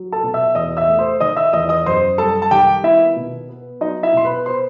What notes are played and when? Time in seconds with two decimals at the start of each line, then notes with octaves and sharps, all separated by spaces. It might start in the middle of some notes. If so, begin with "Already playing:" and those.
Already playing: F#3
0.12 A4 A5
0.24 B2
0.34 E5 E6
0.55 E2 D#5 D#6
0.77 E5 E6
0.88 A3
0.99 C5 C6
1.20 D#3 D#5 D#6
1.36 E5 E6
1.53 E2 D#5 D#6
1.69 D#5 D#6
1.86 F#2 C5 C6
2.18 G3 A4 A5
2.42 A5
2.51 D#3 G4 G5
2.83 B3 E4 E5
3.16 B2
3.49 B3
3.81 F#3 D#4 D#5
4.03 E4 E5
4.13 B2 C6
4.25 B4 B5
4.46 C5 C6